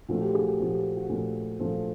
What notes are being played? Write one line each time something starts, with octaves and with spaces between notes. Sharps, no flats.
A#2 F3 A3 F#4
G4
F#4 G#4
G4
A#2 F3 A3 F#4
G4
F#4
A#2 F3 A3
A#2 F3 A3